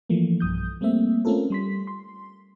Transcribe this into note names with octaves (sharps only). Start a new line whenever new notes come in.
E3 F3 A3 A#3
B1 G2 D#6 G6
G3 A3 A#3 C4 E5
A3 C4 C#4 F4 A4 A#4
G3 C6 B6
C6